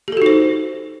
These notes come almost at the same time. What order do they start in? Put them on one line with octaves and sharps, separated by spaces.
G4 A4 F#4 D#4 C5